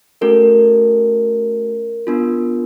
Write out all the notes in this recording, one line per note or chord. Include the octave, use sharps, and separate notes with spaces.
A3 C#4 F#4 A4 A#4
B3 D4 F4